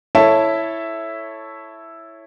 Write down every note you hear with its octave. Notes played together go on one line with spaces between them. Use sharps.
E4 A4 C#5 E5 A5